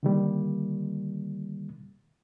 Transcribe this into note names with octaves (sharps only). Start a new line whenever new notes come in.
D3 D#3 G3 A#3